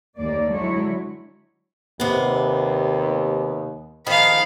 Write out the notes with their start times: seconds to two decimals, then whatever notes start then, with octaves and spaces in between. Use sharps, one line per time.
0.16 D#2 A#3 D5
0.50 D3 F#3 G#3 E4 C#5
2.00 D#2 C3 B3
4.06 D#3 F3 G#4 F5 B5